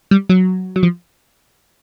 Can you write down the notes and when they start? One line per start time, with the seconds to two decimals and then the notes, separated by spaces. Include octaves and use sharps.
0.11 G3
0.29 F#3
0.76 F#3
0.83 F3